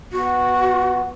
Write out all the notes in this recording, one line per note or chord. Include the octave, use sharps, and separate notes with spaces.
B3 F#4